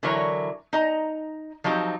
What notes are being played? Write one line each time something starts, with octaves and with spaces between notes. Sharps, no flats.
D3 E3 F#3 E4 A#4 C#5
D#4 D#5 A#5
F3 F#3 C4 D#4 G4